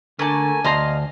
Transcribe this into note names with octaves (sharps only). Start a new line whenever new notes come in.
D3 A3 A#3 G#5 A5
D2 D#5 F5 A5 A#5 C6